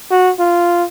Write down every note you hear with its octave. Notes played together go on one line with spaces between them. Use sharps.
F#4
F4